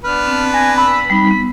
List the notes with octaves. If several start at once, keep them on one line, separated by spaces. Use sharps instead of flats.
B3 D4 B4 F6
C4 A5
G#5 A#6
B5 E6
G3 C4 D#4 B6
B3